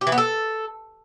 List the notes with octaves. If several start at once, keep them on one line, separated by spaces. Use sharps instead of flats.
G4
E3
B3
A4